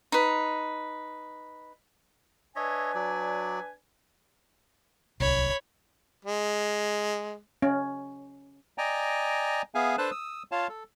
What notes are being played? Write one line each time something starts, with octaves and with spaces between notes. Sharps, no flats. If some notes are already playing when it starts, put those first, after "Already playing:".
D#4 B4
D4 B4 C#5 D#5 E5 G#5
F#3 D5
D1 C2 C#5 B5
G#3
C#4
D5 D#5 G5 G#5 A#5
B3 G#4 E5 F5 G#5
D4 A4 B4 C5 A5 F#6
D#6 E6
F4 C#5 F5 A5
A4